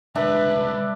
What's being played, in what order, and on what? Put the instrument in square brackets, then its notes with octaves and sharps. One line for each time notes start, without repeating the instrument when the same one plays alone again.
[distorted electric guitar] C2 G#3 [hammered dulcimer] D4 [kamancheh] B4 [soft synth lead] E5